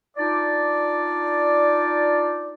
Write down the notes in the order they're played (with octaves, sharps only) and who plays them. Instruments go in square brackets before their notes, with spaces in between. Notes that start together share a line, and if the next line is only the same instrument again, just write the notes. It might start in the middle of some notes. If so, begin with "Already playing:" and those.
[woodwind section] D4 D#4 F4 D5